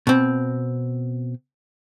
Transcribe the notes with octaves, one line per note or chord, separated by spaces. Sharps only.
B2 C4